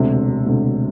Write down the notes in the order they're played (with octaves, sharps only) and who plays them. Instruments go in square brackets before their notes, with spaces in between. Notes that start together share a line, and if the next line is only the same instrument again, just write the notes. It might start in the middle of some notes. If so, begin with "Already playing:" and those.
Already playing: [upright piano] E1 D2 C3
E1 D2 C3